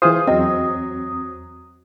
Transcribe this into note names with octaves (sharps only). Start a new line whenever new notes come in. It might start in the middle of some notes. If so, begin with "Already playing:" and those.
E3 F4 G#4 C5 D#6
E2 F#3 C4 D#5